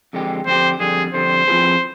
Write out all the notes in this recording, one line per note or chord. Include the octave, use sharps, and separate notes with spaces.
F2 D3 G#3 C4 G4
F2 D3 G#3 C4 G4 C5
F2 D3 G3 G#4
F2 D3 G3 C5
F3 C4 F4 G#4 B4